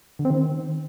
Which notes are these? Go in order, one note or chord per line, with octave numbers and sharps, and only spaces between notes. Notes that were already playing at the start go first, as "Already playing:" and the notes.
D3
C4
D#3